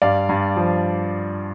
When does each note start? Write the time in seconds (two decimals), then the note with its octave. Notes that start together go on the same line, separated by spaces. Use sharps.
0.02 G2 D5 F5
0.29 G2
0.56 F3